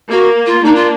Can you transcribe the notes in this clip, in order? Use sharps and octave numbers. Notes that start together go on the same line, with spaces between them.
A#3 F#4
F4
A#3 D4 D#4
F4